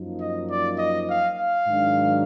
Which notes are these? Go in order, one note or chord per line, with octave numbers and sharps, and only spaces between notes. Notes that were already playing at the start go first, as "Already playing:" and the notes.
Already playing: F#2 F3 A#3 D#4
D#5
D5
D#5
F5
F5
G#2 D#3 F#3 D4